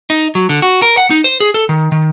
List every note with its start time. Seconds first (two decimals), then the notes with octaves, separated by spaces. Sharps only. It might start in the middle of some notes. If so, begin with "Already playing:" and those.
0.10 D#4
0.35 F#3
0.49 D3
0.62 F#4
0.82 A#4
0.97 F#5
1.10 D#4
1.24 C5
1.40 G#4
1.54 A4
1.69 D#3
1.92 D#3